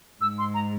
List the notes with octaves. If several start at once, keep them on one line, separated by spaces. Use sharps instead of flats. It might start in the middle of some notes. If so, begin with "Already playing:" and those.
G#2 G#3 E6
C6
A#5